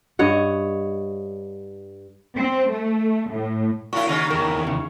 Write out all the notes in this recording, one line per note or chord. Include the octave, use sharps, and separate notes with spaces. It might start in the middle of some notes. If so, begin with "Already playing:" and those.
G2 C#5 D#5 F#5
C4
A3
A2
A2 E4 F#4 C#6
D#2 C#3 D#4
E2 D#3 A#4
C#3